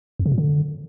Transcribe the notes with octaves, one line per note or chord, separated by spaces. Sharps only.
F2
C#3
A#2
D3